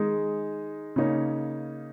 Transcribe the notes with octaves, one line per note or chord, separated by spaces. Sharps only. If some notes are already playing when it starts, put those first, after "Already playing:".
Already playing: D#3 G#3 D#4 G#4
C#3 A#3 D#4 C#5